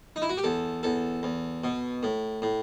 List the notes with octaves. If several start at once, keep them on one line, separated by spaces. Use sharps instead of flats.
D#4
E4
F#4
G4
E2 A4
E2 A4
E2
B2
A2
A2